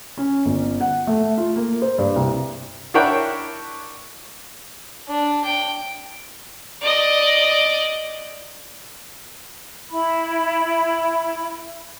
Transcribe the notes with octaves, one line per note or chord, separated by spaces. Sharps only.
C#4
G1
F#5
A3
F4
A#3
C5
G2
C2
D4 E4 A#4 C#5 F#5 G5
D4
G5
D5 D#5
E4 B5